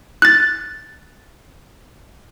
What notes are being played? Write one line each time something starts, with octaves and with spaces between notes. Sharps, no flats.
F#6 A6